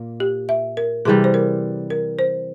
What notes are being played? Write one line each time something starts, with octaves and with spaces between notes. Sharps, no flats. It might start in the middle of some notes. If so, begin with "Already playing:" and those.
Already playing: A#2 A#3
G4
E5
A#4
C3 E3 G3 G#4
C5
A#4
A#4
C5